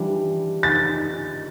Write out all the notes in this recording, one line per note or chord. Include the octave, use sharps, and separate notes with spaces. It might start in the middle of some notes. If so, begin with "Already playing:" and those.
Already playing: E3 G3 D4 F4
A6